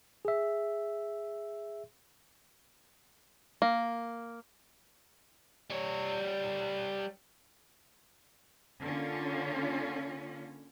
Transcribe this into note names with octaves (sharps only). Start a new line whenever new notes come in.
G#4 E5
A#3
G3 C#5
D3 A#3 C#4 F4